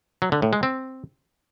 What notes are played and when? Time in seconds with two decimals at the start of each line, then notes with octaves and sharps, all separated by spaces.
0.22 F#3
0.32 D3
0.42 A2
0.53 G#3
0.63 C4